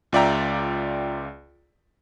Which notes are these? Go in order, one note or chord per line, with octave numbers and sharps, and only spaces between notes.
C#2 F4 D5 E5 G5 A#5